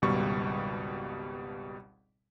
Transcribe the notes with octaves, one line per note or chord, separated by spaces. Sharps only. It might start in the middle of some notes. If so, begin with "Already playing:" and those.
G#1 C#2 B2 G3 C#6